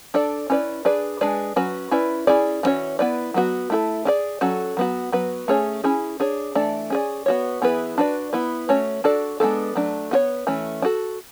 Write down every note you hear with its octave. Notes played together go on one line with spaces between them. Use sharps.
D4 A4 D5
C#4 E4 B4 D5
D4 G#4 B4 D5
G#3 D4 G#4 B4 D5
F#3 C#4 F#4 B4
C#4 E4 B4 D5
C#4 E4 G#4 D5
E3 G#3 C#4 F#4 C#5
B3 E4 B4 D5
F#3 B3 F#4
A3 E4 A4
D4 G#4 D5
F#3 C#4 F#4 A4
F#3 B3 F#4
F#3 B3 F#4 B4
A3 C#4 G#4 C#5
C#4 E4 G#4
D4 G#4 C#5
E3 A3 D4 A4 D5
C#4 G#4 D5
B3 F#4 C#5
E3 B3 E4 G#4 B4
D4 F#4 B4 D5
B3 E4 B4
A3 C#4 F#4 C#5
D4 F#4 A4 D5
G#3 B3 D4 A4
F#3 A3 D4
B3 F#4 C#5
E3 A3 C#4
D4 F#4 A4